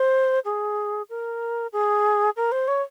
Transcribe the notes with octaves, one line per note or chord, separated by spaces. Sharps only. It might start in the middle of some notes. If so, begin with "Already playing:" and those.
Already playing: C5
G#4
A#4
G#4
A#4
C5
C#5